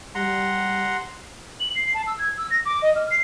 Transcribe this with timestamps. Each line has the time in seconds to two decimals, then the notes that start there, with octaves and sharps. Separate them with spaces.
0.15 G3 F#5 A#5 C6
1.60 F#7
1.75 C7
1.94 A5
2.07 E6
2.19 G#6
2.37 E6
2.50 A#6
2.65 D6
2.82 D#5
2.95 F6
3.11 C7